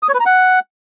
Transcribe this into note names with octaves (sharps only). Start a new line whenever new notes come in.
D#6
C#5
B4
A#5
F#5